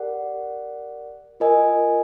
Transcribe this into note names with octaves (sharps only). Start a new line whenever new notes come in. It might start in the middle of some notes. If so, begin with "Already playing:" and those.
Already playing: G4 A#4 D5 F#5
F4 A#4 D#5 G#5